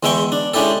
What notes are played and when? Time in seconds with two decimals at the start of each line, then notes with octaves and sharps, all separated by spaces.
0.03 E2 G#3 E4 E5 G5 C#6
0.32 D4
0.54 G#3 C#4 D4 E4 G4 A4